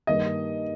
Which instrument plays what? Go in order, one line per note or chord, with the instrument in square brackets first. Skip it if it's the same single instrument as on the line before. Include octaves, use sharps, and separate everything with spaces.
[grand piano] G2 D#3 A#3 [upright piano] D#5